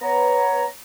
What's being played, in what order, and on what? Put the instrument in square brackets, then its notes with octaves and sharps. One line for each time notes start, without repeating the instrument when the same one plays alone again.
[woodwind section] B3 C#5 A#5